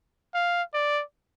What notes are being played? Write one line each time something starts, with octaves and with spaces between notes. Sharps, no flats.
F5
D5